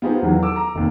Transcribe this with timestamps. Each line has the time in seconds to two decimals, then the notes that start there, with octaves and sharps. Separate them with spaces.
0.02 B3 D#4 F4 G4 G#4 C5
0.22 E2 D#3 E3 F#3
0.42 A4 D6 E6
0.56 A#5
0.75 F1 D#2